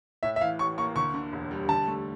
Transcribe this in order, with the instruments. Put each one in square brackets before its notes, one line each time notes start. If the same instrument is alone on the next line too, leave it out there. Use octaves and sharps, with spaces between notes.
[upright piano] A2 [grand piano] E5
[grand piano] E5
[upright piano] E3 [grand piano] F5
[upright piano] A1 [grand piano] C#6
[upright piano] A#3 [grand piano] C#6
[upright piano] D2 [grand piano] C#6
[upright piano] D3
E1
G3
[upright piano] D3 [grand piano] A5
[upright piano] A3